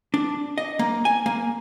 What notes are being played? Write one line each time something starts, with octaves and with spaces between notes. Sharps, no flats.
D4
D#5
A#3
G#5
A#3